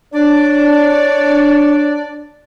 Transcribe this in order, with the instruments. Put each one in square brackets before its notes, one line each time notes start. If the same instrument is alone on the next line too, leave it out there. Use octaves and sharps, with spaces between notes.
[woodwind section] D4 [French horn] C#5 [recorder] D5